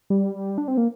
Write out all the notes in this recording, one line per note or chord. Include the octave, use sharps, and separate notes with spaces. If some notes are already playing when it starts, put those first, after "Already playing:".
G3
D4
C4
A#3